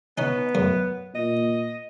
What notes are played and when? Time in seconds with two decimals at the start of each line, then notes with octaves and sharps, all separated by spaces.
0.18 B3 C#4 D#4
0.55 F#2
1.15 A#2 D#5